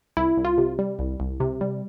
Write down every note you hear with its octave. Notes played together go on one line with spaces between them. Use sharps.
C2 E4
C2
F4
C3
G3
C2
C2
C3
G3